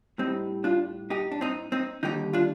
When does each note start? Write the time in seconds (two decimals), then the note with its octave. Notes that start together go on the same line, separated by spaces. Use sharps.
0.18 A2 G3 C4 D#4
0.64 D4 F4
1.10 D#4 G4
1.32 D4
1.41 C4 D#4
1.72 C4 D#4
2.03 D#2 D3 G3 D#4 G4
2.33 D4 F4